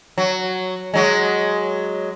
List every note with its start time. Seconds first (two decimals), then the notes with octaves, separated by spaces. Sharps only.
0.18 F#3
0.94 F#3 G#3